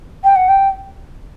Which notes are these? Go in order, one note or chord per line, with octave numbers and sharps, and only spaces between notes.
G5
F#5
G5